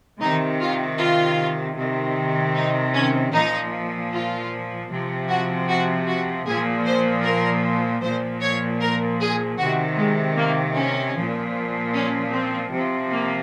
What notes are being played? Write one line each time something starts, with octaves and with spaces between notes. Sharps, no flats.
C3 D#3 D#4
F4
F4
C3 D#3
D#4
C#4
A#2 F3 D#4
F4
C3 F3
F#4
F#4
F#4
A#2 F3 G#4
C5
A#4
A#2 F3 C5
C#5
A#4
G#4
C3 D#3 F#4
G#3
A#3
C#4
F3
A#2
C#4
C4
C3 F3
A#3